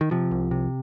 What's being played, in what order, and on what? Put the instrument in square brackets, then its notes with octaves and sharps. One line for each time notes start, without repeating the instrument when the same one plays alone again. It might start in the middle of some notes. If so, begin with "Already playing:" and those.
[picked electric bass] D#3
C3 F3
C2
C3